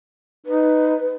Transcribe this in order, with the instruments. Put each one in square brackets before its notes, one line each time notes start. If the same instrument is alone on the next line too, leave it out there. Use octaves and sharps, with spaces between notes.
[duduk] D#4 [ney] B4